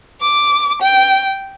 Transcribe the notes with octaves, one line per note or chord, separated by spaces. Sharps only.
D6
G5